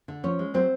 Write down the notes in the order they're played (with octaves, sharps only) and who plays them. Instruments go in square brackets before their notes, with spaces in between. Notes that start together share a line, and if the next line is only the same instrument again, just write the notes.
[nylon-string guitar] D3
F3 C#4 C#5
G#3
F#3 C4 C5